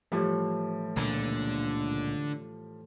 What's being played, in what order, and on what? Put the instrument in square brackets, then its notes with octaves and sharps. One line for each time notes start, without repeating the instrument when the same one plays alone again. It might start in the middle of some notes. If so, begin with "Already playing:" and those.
[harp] A2 E3 [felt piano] F3 G3
[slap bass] C#2 A#2 A#3 [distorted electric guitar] D3